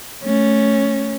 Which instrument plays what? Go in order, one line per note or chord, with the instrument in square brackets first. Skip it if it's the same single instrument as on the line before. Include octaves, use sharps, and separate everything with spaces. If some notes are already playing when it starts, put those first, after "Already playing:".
[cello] A3 C#4